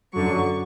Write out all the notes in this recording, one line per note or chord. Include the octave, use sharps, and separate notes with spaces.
F#2 D3 F#3 C#6